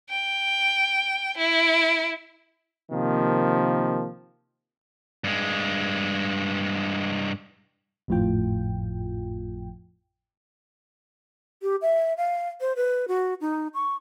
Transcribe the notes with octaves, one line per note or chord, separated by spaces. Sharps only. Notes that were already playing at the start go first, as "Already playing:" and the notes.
G5
E4
C3 D#3 F3 A#3
G2 G#3
G#1 F2 A2 F3 F4 G5
G4
E5
F5
C5
B4
F#4
D#4
C#6